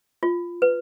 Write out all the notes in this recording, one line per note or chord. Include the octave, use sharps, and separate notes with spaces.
F4
B4